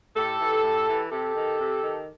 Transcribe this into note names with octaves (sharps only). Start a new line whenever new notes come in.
A2 G4 A4
E3
A2
E3
C3 G4 A4
D#3
C3
D#3